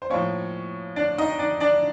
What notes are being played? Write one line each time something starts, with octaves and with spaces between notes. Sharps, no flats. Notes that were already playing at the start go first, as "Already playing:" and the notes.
C5
A2 F3 A#3 C#4 C#5
D4 D5
D#4 D#5
D4 D5
D4 D5